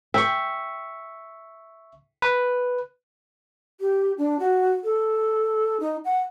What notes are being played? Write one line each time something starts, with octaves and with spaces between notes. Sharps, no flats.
E5 G5 C#6
B4
G4
D4
F#4
A4
D#4
F#5